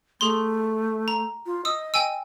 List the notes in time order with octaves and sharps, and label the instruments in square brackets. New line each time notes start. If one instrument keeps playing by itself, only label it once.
[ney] A3 [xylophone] G#4 C6
[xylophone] A#5
[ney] F4
[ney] D#5 [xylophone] D#6 E6
[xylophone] G5 G#5 E6